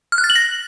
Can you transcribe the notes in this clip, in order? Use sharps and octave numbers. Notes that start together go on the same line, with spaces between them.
F6
F#6
A6
F#7
A#6